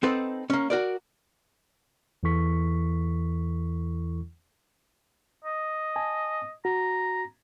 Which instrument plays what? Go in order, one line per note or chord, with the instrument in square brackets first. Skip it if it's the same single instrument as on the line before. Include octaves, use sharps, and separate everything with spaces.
[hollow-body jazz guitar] C4 D#4 A4 B4 C5 F#5
A#3 C#4
F#4 A#4 D5
[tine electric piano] E2 E3 E4 A4 C#6 B6
[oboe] D#5
[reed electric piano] G#5 A5
[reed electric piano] F#4 [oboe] A#5